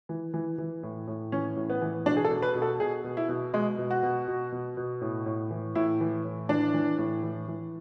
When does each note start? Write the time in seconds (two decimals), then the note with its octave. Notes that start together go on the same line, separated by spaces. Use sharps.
0.09 E3
0.34 E3
0.58 E3
0.83 A2
1.07 A2
1.32 E3 C#4
1.56 A2
1.70 B3
1.82 E3
2.06 B2 D4
2.17 G#4
2.25 A4
2.31 B2
2.42 B4
2.55 B2
2.62 A4
2.80 B2 G#4
3.04 B2
3.17 E4
3.29 B2
3.53 B2 G#3
3.78 B2
3.91 F#4
4.03 B2
4.28 B2
4.52 B2
4.77 B2
5.01 A2
5.26 A2
5.51 E3
5.75 A2 E4
6.01 E3
6.24 A2
6.49 E3 D4
6.74 E3
6.98 A2
7.23 E3
7.48 E3